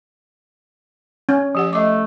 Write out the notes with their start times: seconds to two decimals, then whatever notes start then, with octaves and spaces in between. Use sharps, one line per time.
1.29 C#4
1.55 F3 G4 F#5
1.73 A3 D#5 D6